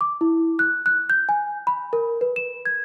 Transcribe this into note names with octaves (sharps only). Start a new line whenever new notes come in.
D6
E4
F#6
F#6
G6
G#5
B5
A#4
B4
E7
G#6